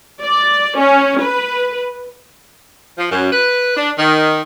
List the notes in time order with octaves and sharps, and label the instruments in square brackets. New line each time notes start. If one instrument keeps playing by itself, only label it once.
[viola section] D5
C#4
B4
[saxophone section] F3
F#2
B4
D4
D#3